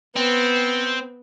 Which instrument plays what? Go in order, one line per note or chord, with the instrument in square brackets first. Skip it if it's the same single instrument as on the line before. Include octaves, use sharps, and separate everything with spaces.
[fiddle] B3 [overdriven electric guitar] C4